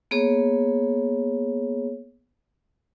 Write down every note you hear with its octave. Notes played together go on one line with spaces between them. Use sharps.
A#3 B3 G#4 C#5